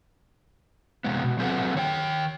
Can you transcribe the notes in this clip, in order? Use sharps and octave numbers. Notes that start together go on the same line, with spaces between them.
C3 G#3 B3
B2
F#3 C4 G#4 A4 B4 F#5
D#3 C#5 G5